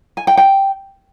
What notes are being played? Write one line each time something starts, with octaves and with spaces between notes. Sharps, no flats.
G#5
G5
G5